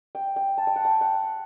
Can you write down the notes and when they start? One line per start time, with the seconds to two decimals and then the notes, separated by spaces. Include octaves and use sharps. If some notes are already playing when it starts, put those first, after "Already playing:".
0.15 G5
0.36 G5
0.58 A5
0.67 G5
0.76 F#5
0.85 G5
1.01 F#5